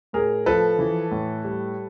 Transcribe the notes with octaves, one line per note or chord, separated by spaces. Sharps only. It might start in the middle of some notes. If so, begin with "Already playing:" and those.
A2 G#4 A#4
F3 A4 B4
E3
A2
G3